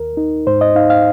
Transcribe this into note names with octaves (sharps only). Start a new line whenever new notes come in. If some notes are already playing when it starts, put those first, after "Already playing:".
Already playing: D#2 A#4
D#4
G#2 C5
D#5
D#4 F5
F5